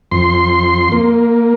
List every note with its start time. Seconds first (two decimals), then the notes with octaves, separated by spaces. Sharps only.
0.12 F2 C6
0.92 A#3